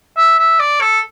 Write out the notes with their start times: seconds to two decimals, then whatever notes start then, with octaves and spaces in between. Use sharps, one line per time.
0.17 E5
0.38 E5
0.59 D5
0.81 A4